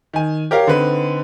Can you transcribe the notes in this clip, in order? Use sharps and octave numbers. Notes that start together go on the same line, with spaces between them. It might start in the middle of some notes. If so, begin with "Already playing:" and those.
D#3 G#5
G4 A#4 C#5 F5
D3 C4 D#4 B4